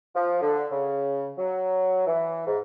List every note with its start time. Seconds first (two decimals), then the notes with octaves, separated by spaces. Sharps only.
0.15 F3
0.41 D3
0.71 C#3
1.38 F#3
2.06 E3
2.47 G#2